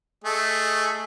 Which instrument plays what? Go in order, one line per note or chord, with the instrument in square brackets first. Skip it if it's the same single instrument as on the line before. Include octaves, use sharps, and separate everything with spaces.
[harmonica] A3 G#4 D#5